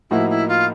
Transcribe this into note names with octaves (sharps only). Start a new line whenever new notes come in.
A2 F3 A#3 D#4 E4 F#4
E4
F4